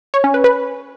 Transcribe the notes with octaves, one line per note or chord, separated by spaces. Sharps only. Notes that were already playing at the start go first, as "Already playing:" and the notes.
C#5
C#4
B4
B4